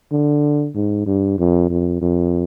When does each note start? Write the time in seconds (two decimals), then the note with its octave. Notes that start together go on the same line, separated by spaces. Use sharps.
0.12 D3
0.75 G#2
1.07 G2
1.39 F2
1.70 F2
2.02 F2